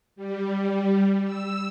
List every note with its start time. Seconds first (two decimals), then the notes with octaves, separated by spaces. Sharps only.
0.16 G3
1.24 E6